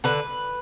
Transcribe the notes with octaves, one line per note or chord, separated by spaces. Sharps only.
D3 B4